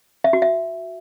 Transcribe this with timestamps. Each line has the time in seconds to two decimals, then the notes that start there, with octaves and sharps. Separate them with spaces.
0.24 E5
0.33 F#4
0.42 E5